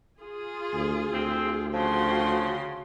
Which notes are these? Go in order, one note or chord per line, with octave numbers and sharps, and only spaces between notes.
F4 G#4
D2
D2 C4
C#3 F3 F#4 G5 C6